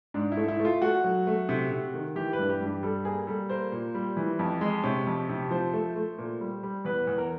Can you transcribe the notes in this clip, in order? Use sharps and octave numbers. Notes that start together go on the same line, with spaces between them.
G#2 D4
E4
A3
E4
A3
F4
A3 F#4
F#3
A3
C3
C3
D#3
E3 G4
B4
G2
G4
G2
G4
G3 A4
A#3 G#4
G3 A4
A#3 C5
A#2
G3
E3
F2
G#3
C3 C#5
F2
C3
F3 C5
A3
A3
A#2
G3
G3
E2 B4
E2
A#4